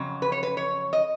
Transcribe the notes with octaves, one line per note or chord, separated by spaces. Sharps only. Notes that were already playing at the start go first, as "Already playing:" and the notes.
Already playing: F2 C#3 F#3
B4
C#5
B4
C#5
D#5